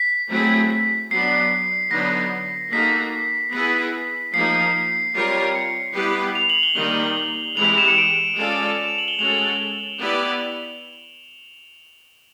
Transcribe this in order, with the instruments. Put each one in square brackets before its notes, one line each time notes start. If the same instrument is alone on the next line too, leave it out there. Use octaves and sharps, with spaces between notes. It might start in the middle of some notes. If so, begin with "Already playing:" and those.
Already playing: [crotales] B6
[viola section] F#3 A3 C4 E4 G#4
[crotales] B6
[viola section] F#3 B3 D4 [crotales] C7
[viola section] D3 F#3 B3 D#4 [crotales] A#6
[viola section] A#3 D#4 F#4 A4 [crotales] B6
[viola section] B3 E4 G#4 B4 [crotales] B6
[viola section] F3 A#3 D#4 [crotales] C7
[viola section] G3 C4 F4 A#4 C#5 [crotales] C7
[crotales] C#7
[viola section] G3 B3 E4 G4 B4
[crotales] F7
F#7
G7
[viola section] D#3 G3 A#3 D#4 [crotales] F#7
[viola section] E3 G#3 C4 E4 G4 [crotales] F7
[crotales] E7
C#7
D7
[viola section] G#3 C#4 F4 A4 D5
[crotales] E7
F7
F#7
G7
[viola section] G#3 C#4 F#4 A4 [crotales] F7
[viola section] B3 E4 G4 B4 D5